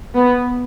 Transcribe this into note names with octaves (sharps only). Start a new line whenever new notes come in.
B3